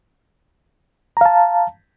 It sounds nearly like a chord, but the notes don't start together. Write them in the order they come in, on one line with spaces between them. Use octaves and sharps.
A#5 F5 A5